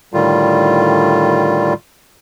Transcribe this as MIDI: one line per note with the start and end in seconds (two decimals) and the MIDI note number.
0.14 1.74 45
0.14 1.74 50
0.14 1.74 51
0.14 1.74 55
0.14 1.74 65